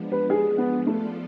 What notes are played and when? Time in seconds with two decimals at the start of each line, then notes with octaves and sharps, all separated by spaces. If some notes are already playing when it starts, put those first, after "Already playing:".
Already playing: F3 G#3 B3 D4
0.12 B4
0.30 G#4
0.58 B3
0.86 F3 A3 B3 F4 A4 D5